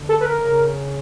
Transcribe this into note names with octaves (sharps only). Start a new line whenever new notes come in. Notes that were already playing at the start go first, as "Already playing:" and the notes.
Already playing: D3
A4
B4
A#4
C#3